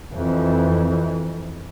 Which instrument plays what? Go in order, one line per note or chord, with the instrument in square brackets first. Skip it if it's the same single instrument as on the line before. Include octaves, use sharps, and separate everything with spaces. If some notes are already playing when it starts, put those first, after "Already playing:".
[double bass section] F2 E3